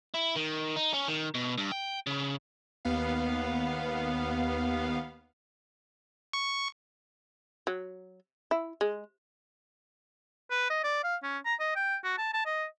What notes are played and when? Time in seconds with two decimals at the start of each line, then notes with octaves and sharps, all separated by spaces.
0.14 E4
0.36 D#3
0.76 D#4
0.93 C#4
1.08 D#3
1.35 B2
1.58 G2
1.72 G5
2.07 C#3
2.85 D#2 B3 F5
6.33 C#6
7.67 F#3
8.51 E4
8.81 G#3
10.50 B4
10.70 D#5
10.84 D5
11.04 F5
11.23 C#4
11.45 A#5
11.60 D#5
11.76 G5
12.04 F#4
12.18 A5
12.33 A5
12.46 D#5